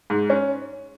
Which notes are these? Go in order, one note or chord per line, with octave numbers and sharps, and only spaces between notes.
G#2
C#4